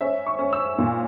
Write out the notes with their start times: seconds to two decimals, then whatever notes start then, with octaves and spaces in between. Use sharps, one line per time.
0.01 C#4 E5
0.26 C#6
0.39 C#4
0.53 E6
0.78 A#2